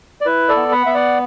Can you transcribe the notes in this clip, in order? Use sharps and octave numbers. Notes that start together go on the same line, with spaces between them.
D5
E4 B4
A4 D5
B3
F#5 B5
B3 E5
D5 F#5